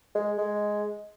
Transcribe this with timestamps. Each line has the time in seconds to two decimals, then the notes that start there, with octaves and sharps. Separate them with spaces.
0.15 G#3
0.38 G#3